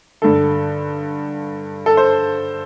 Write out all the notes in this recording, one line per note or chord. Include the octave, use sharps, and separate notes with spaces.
G2 D3 A4
A4
C5